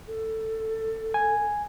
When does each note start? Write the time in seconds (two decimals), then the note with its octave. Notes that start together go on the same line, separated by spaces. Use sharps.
0.08 A4
1.14 G#5